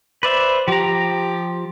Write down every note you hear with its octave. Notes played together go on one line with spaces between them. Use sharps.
B4 C5 D5 E5
F3 G4 A#5